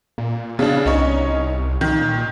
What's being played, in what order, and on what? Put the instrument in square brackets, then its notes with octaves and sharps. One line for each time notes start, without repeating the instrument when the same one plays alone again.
[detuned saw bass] A#2
[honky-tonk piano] C#3 D4 [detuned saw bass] B3
[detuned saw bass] C2 [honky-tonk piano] C#4 D#4 C#5
[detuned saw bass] A#2 [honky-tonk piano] D#3